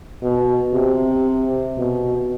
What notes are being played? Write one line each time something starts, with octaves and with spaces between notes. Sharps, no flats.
B2
C3
B2